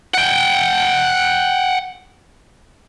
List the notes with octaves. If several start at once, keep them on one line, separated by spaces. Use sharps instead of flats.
F#5 G5